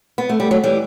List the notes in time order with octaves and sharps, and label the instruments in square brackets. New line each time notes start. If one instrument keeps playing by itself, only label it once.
[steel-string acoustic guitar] B3
A3
G3
F#3 A3
E3 G3